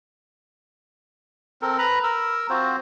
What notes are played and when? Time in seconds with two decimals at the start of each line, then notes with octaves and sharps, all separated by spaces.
1.62 C4 A4 A#4
1.78 B4 A#5 B5
2.04 A#4 E6
2.50 C4 F4 F#4 C5